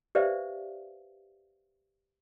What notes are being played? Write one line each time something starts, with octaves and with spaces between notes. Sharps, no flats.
G4 B4 C5 D5 E5 F5